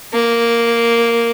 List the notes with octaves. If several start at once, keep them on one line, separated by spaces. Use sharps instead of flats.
A#3